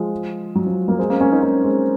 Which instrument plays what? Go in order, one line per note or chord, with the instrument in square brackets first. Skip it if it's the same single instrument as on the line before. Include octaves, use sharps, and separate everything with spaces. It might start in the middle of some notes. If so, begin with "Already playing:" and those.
Already playing: [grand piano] F3 G#3
F#3
F3
F#3 A#3
G#3 C4
A#3 C#4
A#3 C#4
C4 D#4
A#3 C#4
G#3 C4